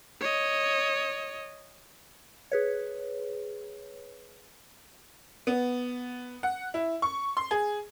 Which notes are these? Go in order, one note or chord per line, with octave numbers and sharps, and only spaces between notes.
C#5 D#5
G#4 B4 C#5
B3
F#5
E4
C#6
C6
G#4